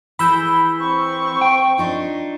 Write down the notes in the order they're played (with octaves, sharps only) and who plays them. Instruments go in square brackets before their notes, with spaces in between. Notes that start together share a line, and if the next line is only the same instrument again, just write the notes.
[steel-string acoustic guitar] E3 G#4 [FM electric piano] B5 E6 G6
[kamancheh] C4 C#6
[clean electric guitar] G5
[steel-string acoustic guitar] D4 D#4 F4